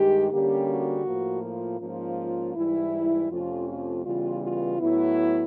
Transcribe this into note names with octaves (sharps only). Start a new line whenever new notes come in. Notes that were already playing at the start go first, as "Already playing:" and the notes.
Already playing: G2 D#3 G#3 G4
D3 G3 A#3 C#4 G4
F#4
A2 F3 A#3
F4
G#2 F3 A#3 C#4 F4
G#2 E3 G3 E4
F2 C3 F3 A3 C#4 F4
F4
C#3 E3 G3 B3 F4
F4
A2 F#3 B3 E4